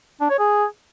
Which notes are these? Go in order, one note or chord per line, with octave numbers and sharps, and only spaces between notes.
D4
C#5
G#4